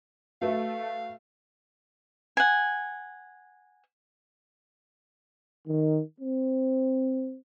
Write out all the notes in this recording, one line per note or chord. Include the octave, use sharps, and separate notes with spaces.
A3 F#4 B4 E5 F5
F#5 G#5
D#3
C4